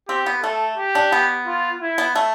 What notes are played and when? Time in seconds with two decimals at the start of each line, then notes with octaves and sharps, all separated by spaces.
0.09 C4 G4
0.26 B3
0.42 A3 A4
0.78 G4
0.95 D4
1.12 B3
1.47 F4
1.81 E4
1.98 B3
2.15 A3